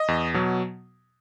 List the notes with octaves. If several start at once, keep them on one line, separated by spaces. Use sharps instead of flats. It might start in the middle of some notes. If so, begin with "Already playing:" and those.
Already playing: D#5
E2
B2 F#3